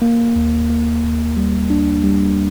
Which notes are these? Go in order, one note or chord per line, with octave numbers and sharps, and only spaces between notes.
A#3
D#2
A#3
D#2
G3
D4
G3